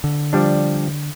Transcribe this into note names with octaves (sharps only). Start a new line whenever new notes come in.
D3
F3 G3 D4